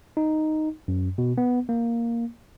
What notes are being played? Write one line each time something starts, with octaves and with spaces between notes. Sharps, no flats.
D#4
F#2
B2
B3
A#3